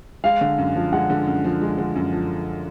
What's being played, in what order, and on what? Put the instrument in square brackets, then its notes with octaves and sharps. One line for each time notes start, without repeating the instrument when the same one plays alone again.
[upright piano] G#3 [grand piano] F5
[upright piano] D3
F#2
F3
[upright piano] G#3 [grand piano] F#5
[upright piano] D3
F#2
F3
G#3
D3
F#2
F3